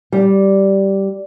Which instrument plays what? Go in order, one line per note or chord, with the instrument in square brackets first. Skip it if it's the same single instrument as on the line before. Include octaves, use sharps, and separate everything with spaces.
[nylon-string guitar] G3